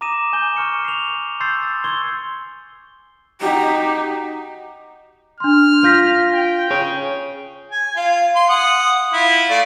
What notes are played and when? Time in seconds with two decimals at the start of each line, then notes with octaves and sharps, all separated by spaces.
0.01 A#5 D6 D#6 A#6 D#7 E7
0.33 G#5 G6 G7
0.56 C#6 F6 C#7
0.85 C7 F7
1.40 C6 C#6 E6 G6 A6 C7
1.84 C6 C#6 E6 G#6 G7
3.41 D#4 F#4 G4
5.40 D4 C6 F6
5.84 F4 G6 A#6 B6
6.33 G5
6.70 G#4 C#5
7.71 G#5
7.96 F4 F5
8.35 C6
8.49 F#5 D#6
9.13 E4 F4
9.50 A3 D5 F5